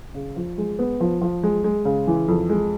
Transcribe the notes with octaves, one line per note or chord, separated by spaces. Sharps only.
C#3
F3
G#3
B3
F3
F3
G#3
G#3
C#3
E3
F2
G#3